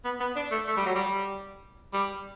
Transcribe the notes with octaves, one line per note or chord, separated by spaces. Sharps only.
B3
B3
D4
A3
A3
G3
F#3
G3
G3